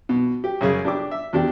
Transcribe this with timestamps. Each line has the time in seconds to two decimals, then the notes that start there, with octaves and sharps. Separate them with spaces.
0.09 B2
0.44 G4
0.61 F#2 C#3 G#4
0.85 D4 G4 D6
1.11 E5
1.33 E2 D4 G4